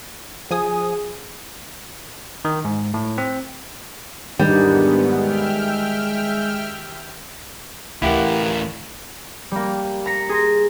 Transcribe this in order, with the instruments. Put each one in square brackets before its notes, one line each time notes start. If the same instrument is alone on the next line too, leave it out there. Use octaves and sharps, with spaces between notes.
[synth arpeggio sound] F3 G#5 D#6 [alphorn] G#4
[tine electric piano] D#3
G#2
A2
C4
[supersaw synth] E2 G#2 B3 [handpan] D#3 D#4 G4 [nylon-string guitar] G3 [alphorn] D4
[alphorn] G#3 [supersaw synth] E5 G5 F6
[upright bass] D2 [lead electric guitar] A2 E3 [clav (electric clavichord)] E4 G4 F#5 [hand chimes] A#4 F5
[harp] G3 A#3
A#5 A#6 B6 C#7
G#4 C6 A#6